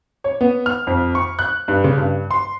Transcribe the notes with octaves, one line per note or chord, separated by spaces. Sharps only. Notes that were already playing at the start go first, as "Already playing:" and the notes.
C#5
B3
F6
F2
C#6
F#6
G2
C#3
G2
C6